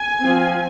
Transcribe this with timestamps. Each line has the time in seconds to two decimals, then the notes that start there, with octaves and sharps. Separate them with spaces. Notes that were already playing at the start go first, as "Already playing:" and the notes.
Already playing: G#5
0.21 F3 C4